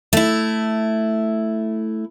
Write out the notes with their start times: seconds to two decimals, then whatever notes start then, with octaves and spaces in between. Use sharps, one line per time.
0.13 A3 E4